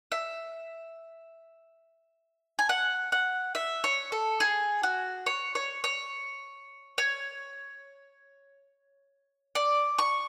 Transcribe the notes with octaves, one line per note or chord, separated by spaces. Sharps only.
E5
G#5
F#5
F#5
E5
C#5
A4
G#4
F#4
C#5
C#5
C#5
C#5
D5
C#6